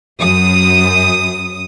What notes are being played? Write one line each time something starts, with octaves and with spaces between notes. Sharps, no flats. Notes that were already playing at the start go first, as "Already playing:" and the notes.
F#2 D#6